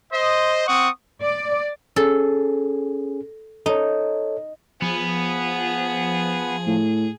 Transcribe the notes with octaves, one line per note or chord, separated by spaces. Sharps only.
C5 D#5
C4 F#5 C#6 D#6
D5
C#4 G#4 A4
D#4 A4 C#5
F3 B3 G#4
A2